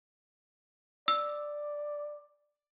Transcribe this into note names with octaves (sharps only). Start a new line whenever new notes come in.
D5 E6